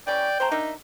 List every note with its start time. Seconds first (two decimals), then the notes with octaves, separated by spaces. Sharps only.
0.07 E3 G3 C#4 D5 G5
0.40 C3 A3 C5 A#5
0.52 D4 D#4 A#4 E5